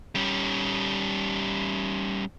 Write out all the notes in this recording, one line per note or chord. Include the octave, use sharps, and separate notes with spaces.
G3 C#4